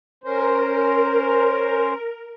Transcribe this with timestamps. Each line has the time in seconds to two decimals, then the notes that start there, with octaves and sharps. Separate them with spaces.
0.24 C#4 A#4 C5